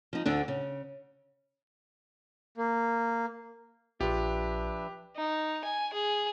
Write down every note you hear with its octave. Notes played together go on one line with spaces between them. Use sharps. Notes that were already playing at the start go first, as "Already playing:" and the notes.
F3 D#4
D2 D3 D4
C#3
A#3
A#1 F3 D4 F4 G4 B4 E5
D#4
G#5
G#4